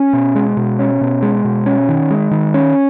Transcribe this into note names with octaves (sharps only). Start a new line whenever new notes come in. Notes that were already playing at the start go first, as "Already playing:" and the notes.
Already playing: C#4
B2
G#3
B2
C#4
B2
G#3
B2
C#4
D#3
G#3
D#3
C#4